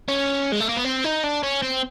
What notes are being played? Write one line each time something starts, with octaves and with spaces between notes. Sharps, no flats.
C#4
G#3
A3
A#3
B3
C4
D#4
D4
C#4
C4